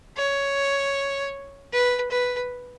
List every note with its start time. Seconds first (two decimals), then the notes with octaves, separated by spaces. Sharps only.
0.17 C#5
1.72 B4
2.11 B4